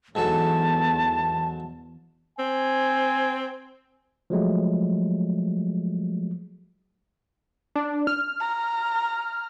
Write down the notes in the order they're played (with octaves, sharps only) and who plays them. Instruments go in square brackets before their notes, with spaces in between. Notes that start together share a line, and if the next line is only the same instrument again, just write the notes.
[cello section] E2 [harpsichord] G#2 F#3 A4 [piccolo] A5
[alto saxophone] C4 [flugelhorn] G#5
[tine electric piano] F3 F#3 G#3 A3
[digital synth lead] D4
F6
[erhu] A#5